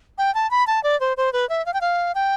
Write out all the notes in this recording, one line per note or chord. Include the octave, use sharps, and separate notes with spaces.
G5
A5
B5
A5
D5
C5
C5
B4
E5
F5
G5
F5
G5